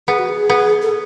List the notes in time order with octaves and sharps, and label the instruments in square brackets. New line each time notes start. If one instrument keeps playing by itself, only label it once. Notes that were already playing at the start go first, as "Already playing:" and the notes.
[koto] B3 [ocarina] G#4
[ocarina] F#4
G#4
[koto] B3
[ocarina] A4